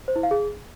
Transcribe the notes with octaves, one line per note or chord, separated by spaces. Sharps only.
C5
E4
F5
G#4